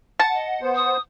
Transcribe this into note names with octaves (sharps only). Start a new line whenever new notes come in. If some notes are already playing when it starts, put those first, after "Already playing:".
F#5 A5
D#5
B3 C5
D#6